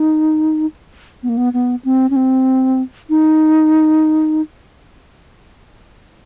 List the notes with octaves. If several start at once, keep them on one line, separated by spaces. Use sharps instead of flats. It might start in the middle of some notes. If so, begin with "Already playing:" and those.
Already playing: D#4
B3
A#3
B3
B3
C4
C#4
C4
D#4